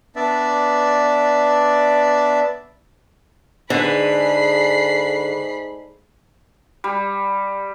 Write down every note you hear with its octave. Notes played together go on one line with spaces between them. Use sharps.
B3 D4 D5 E5
G#2 D3 G#3 B4 B5 C7
G3